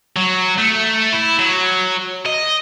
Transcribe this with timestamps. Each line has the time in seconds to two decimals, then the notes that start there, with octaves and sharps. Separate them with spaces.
0.16 F#3
0.58 A3
1.13 E4
1.39 F#3
2.26 D#5